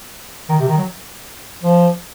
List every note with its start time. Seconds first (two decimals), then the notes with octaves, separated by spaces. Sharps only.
0.49 D#3
0.59 C3
0.68 D#3
0.78 F#3
1.63 F3